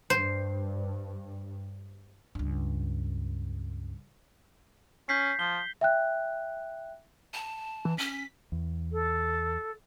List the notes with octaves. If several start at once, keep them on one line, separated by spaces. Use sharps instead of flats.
G2 C5
C#2 G2
C#4 G6 B6 C7
F3 G7
E5 G5 F#6
A5
E3
C#4 B6
E2
A4